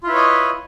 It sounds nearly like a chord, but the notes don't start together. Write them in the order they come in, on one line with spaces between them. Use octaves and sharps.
F4 E4 B4 C#5 D#5